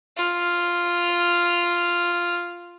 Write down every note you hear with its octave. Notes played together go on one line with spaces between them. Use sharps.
F4 F6